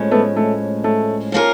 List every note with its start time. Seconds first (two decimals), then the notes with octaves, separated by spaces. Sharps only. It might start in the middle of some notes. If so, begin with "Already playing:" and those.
Already playing: A2 F3 G#3 C#4
0.11 A3 B3
0.36 A3
0.84 A3
1.32 F3 A#3 C#4 F4 A#4